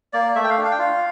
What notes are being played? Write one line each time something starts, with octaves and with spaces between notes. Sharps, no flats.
A#3 D5
A3 E5
G5
F5
D4
F5
G5
F4 F5